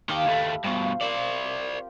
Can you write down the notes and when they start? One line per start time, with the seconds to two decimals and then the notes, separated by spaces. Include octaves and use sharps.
0.09 D#3 G4 F5 A5 E6
0.26 D#2 A3 G4 E5 B5
0.64 G2 B2 F4 C5
1.01 C4 F4 A#4 C5 D5
1.45 G4 G5